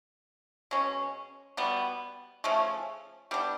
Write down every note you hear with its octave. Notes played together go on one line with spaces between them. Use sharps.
B2 G#3 C#4
B2 G3 B3
C#3 F3 A3 C#4
G3 B3 D4 G4